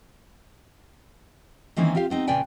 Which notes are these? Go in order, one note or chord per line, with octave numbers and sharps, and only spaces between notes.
D#3 E3 A#3 C4 C#4 D#4
C4 F4 G4 F5
B3 C4 D#4
A#2 C#3 B4 D5 G5 G#5